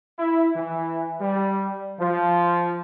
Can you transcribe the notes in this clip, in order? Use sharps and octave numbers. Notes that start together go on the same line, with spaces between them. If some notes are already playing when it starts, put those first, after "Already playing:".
E4
E3
G3
F3